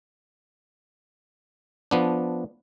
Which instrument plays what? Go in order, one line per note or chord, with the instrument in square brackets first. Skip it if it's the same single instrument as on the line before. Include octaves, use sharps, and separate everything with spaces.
[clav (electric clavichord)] F3 B3 D4